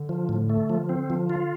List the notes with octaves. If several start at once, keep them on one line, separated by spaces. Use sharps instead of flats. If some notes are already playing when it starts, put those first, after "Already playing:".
Already playing: D3
F3
A2
A3
F3
C4
F3
F4